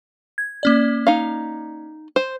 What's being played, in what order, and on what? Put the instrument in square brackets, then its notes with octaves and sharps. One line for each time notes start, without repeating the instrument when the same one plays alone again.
[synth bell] G#6
A#3 C#4 D5
[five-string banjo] D#4 F5
C5